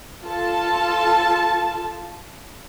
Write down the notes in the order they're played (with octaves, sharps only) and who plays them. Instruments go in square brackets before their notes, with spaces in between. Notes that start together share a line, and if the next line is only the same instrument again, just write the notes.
[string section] F4 A4 A5